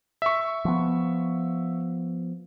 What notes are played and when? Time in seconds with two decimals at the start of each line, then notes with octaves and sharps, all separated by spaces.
0.22 E5 C#6
0.65 F3 B3